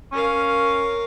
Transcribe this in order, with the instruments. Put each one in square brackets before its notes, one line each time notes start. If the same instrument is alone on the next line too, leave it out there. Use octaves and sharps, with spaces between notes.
[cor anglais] C#4 [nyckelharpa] A#4 F5